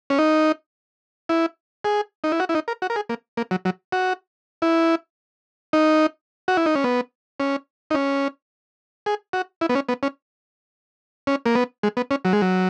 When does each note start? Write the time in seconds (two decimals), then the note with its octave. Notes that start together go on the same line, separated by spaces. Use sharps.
0.10 C#4
0.19 D#4
1.29 E4
1.85 G#4
2.24 D#4
2.32 E4
2.40 F#4
2.49 E4
2.55 D#4
2.68 A#4
2.82 F#4
2.90 A#4
2.96 G#4
3.09 A#3
3.37 A#3
3.51 F#3
3.65 F#3
3.92 F#4
4.62 E4
5.73 D#4
6.48 F#4
6.57 E4
6.66 D#4
6.75 C#4
6.84 B3
7.40 C#4
7.91 D#4
7.95 C#4
9.06 G#4
9.33 F#4
9.61 E4
9.69 B3
9.75 C#4
9.89 B3
10.03 C#4
11.27 C#4
11.46 A#3
11.55 B3
11.83 G#3
11.97 B3
12.11 C#4
12.25 F#3
12.33 G#3
12.41 F#3